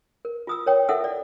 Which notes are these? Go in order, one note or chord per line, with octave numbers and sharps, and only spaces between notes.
A#4
F4 D#6 E6
A#4 C#5 G5
E4 A4 A#4 E5 F#5 E6
D5